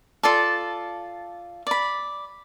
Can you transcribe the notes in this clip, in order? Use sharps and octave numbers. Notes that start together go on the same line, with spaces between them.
F4 A4 D5 A5
D5 B5